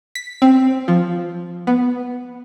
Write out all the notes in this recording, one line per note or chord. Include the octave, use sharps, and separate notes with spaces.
B6
C4
F3
B3